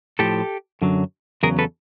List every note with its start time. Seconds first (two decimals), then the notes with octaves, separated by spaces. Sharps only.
0.19 A2 F3 G4 A4
0.82 F#2 D3 F#3
1.43 E2 C#3 F#3 G#4 A#4
1.59 A4 B4